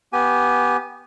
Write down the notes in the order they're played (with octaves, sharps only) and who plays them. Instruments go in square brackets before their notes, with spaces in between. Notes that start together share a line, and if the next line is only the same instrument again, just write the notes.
[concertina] B3 G4 G#5